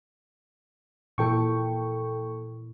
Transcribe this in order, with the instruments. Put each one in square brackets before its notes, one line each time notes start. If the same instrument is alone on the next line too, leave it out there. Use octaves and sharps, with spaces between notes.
[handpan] A#2 E3 E4 [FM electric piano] A4 G5 C#6